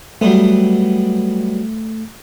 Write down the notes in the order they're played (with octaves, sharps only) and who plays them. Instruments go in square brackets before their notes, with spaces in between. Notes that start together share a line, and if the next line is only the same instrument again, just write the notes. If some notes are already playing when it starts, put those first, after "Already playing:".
[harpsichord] F#3 G3 B3 [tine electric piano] A3